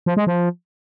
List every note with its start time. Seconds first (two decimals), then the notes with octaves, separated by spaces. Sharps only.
0.06 F3
0.17 G#3
0.27 F3